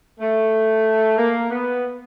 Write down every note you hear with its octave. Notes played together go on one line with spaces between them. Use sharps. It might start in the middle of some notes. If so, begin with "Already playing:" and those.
A3
A#3
B3